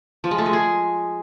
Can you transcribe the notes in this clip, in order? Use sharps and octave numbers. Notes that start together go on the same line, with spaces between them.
F3
G#3
A3
G#3
G#4